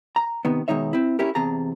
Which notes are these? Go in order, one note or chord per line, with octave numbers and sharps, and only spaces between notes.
A#5
C3 D#3 B3
B2 D#3 G#3 D#4 C#5 E5
C4 E4
C#4 E4 G4 A#4
E2 C3 G#4 A5 A#5